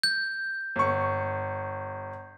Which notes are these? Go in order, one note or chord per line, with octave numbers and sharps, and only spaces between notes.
G6
G1 C#6